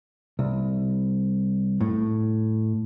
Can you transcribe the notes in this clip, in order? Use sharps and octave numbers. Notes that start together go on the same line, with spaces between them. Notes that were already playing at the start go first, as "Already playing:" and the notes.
C2
A2